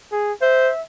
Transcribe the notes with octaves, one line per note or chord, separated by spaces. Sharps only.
G#4
C5 E5